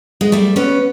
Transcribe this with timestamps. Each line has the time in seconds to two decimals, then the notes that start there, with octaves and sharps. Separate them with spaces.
0.21 G#3
0.32 G3 A3
0.56 B3 C#4